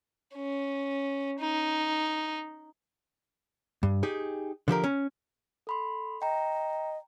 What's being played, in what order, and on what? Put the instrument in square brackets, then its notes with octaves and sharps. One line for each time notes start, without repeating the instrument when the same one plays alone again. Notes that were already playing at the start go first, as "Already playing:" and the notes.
[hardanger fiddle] C#4
D#4
[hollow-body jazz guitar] G2
D#4 G4 G#4
D3 F3 G4 A#4
C#4
[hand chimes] A4 B5 C6
[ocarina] D#5 [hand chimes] G5 A#5